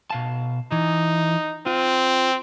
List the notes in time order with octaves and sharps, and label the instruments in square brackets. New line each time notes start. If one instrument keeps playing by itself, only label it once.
[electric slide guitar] B2 F5 A5
[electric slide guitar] E3 [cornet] D#4
[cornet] C4 [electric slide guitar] F4